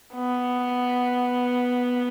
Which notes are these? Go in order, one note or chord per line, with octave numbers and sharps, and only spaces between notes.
B3